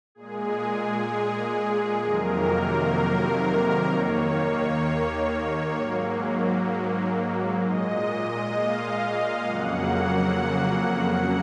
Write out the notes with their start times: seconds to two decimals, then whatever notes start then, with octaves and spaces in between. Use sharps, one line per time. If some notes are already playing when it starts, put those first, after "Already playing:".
0.15 A#2 G#3 G#4
2.01 F2 C3 D#3 F#3 A#3 A#4
2.93 A#4
3.86 D#2 D#3 A#3 C#5
5.72 G#2 F#3 A#3
7.58 A#2 G#3 D#5
8.50 F5
9.43 F2 C#3 F#3 A#3 F#5